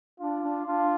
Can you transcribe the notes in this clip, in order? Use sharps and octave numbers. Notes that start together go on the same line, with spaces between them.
D4 F4
D4
D4 F4